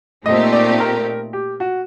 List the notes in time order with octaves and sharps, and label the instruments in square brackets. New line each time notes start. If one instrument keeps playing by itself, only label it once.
[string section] A#2 A3 C4 D#4 G4 [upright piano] D#5
[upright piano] D5
A#4
G4
F#4